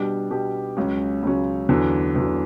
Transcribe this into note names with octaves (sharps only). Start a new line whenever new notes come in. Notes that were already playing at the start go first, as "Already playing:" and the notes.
Already playing: B2 G3 D4 G4
B2 G3 D4 G4
C#2 C#3 F#3 C#4
C#2 C#3 F#3 C#4
E2 D3 F#3
E2 D3 F#3